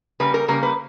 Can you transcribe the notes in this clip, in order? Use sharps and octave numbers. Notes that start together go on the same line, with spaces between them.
C#3 G3 A#3 B4
A#4
C#3 G3 A#3 A#4
B4